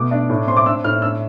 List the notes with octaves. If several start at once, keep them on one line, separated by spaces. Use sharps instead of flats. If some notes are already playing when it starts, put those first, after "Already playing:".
Already playing: B2 A3 D6
D4
A2
C4 C6
D6
D4 E6
A2 F6
D4 E6